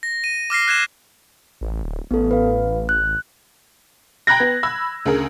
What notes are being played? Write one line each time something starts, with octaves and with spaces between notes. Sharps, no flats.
A#6
D#7
D6 F6 A#6 C7
F#6 G#6 C7 E7
A1
D1
A1 B3 A4
B4 F5
F#6
G5 A#5 B5 F#6 G#6 A#6
B3
B5 E6 G#6
D2 C#3 G#4 A#4